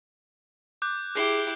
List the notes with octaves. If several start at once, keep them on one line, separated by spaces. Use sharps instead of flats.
D6 F#6 G6
E4 G4 G#4 F#6 C7 G7